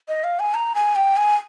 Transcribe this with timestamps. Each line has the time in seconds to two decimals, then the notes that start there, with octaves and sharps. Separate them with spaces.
0.08 D#5
0.24 F5
0.39 G#5
0.54 A#5
0.75 G#5
0.96 G5
1.17 G#5